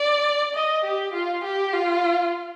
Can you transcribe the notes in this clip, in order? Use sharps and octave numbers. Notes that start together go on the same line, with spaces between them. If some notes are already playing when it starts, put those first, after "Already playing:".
Already playing: D5
D#5
G4
F4
G4
F4